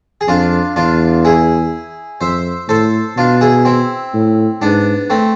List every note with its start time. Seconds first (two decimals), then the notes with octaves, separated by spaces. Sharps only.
0.21 G#4
0.28 F2 D4 F4
0.76 E2 D4 F4
1.25 E4 G#4
2.21 F2 C5 E5
2.69 A2 A4 C5
3.17 B2 D4 F4
3.41 E4 G#4
3.65 C4 E4
4.14 A2
4.62 G#2 B3 D4
5.10 A3 C4